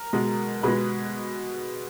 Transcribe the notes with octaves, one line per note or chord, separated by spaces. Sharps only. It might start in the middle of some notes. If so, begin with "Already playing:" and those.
Already playing: A#4
B2 G#3
B2 G#3 G#4 B4